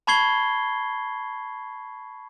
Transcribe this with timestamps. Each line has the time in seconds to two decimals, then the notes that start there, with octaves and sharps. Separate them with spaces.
0.07 A5 B5 C#6 G#6 C7 G7